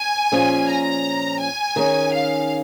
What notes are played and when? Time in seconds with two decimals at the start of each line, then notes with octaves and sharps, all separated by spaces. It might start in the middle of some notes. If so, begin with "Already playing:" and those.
Already playing: G#5
0.32 A#2 F3 C#4 G#4
0.68 A#5
1.40 G#5
1.76 D#3 C#4 G#4
2.13 F5